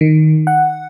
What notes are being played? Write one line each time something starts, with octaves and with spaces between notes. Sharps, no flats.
D#3
F#5